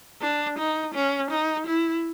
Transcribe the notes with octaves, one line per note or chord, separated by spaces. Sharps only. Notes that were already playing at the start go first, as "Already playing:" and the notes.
D4
D#4
C#4
D#4
E4